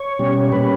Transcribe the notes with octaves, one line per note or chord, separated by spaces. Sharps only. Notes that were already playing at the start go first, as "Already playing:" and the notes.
Already playing: C#5
B2 G3 C#4
A#2 G3 C#4 B4